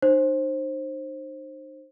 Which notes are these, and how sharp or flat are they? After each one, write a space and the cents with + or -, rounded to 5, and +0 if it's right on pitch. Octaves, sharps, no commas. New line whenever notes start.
D#4 -40 C5 +20